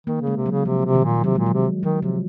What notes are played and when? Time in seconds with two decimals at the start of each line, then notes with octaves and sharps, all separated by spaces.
0.07 D#3 A#3
0.21 C#3
0.27 G#3
0.36 C3
0.46 F#3
0.51 C#3
0.65 C3 F3
0.85 C3
0.95 D#3
1.05 A#2
1.24 C3 F#3
1.35 A#2 G#3
1.46 F#3
1.53 C3
1.82 D#3 F#3
2.02 C3 F3